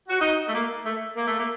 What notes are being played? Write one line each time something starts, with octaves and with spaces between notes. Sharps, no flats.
F#4
D#4
A3
A#3
A3
A#3
A3
A#3